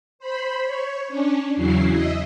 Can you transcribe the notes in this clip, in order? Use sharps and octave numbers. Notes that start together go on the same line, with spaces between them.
C5 B5
C#5
C#4 D4
E2 C#3 F#3 E4 C7
D#5 E5